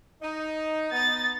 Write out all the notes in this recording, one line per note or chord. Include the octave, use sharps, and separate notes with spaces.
D#4
B3 D#4 A6